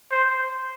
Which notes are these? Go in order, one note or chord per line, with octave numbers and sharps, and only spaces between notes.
C5